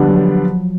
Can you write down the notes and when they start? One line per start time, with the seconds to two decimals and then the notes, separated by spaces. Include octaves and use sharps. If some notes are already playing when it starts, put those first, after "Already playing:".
Already playing: D3 F3 G3 B3 D4
0.09 F#3